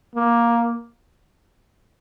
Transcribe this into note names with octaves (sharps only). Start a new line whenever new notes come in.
A#3